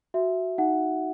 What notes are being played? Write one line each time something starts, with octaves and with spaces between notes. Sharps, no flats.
F#4 E5
D#4 F#5